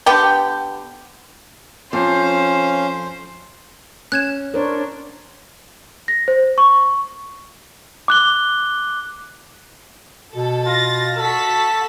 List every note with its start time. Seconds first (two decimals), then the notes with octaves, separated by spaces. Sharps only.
0.06 D3 B3 G4 G5
1.93 F2 C#4 C5 F5
4.12 C#4 F#6 G#6 E7
4.54 D4 A#4 C5 C#5
6.08 A#6
6.28 C5
6.58 C#6
8.08 D6 F#6 G7
10.35 B2 A4
10.66 F4 A6 A#6
11.18 F#4 A4 A5 B6